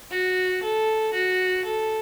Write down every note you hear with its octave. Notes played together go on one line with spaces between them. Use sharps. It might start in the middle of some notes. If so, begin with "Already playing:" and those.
F#4
A4
F#4
A4